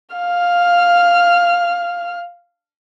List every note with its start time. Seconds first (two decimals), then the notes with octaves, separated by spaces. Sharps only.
0.15 F5 F6